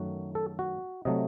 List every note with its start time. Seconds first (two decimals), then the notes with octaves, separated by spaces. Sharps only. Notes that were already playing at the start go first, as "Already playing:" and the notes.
Already playing: F#2 D#3 F#3 A3 F#4
0.35 A4
0.59 F#4
1.05 C3 F#3 A3 D#5